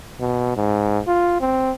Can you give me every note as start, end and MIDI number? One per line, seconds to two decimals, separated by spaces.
0.20 0.55 47
0.56 1.01 44
1.07 1.39 65
1.41 1.72 60